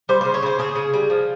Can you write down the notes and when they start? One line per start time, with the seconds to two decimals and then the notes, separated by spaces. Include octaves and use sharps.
0.09 G3 C5
0.21 C#3 C5
0.34 C#5
0.43 C#3 C5
0.59 C#3 G#4
0.75 C#3
0.94 G3
1.10 F3